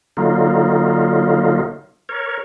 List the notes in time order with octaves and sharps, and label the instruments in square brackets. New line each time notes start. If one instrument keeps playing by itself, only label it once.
[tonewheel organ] D3 F#3 A#3 D#4 F4
A#4 C#5